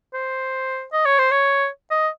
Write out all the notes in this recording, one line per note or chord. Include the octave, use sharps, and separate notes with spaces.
C5
D#5
C#5
C5
C#5
D#5